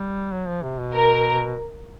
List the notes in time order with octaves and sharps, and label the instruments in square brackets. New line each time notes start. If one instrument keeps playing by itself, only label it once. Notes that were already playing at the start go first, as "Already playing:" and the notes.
Already playing: [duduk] G3
F#3
F3
C3
B2
[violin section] A#4